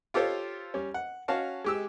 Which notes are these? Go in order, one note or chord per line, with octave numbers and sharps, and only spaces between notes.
F4 G4 A4 C5 C#5 F5
G3 C#4
F#5
C#4 F#4 F5 A5
G#3 G4 E6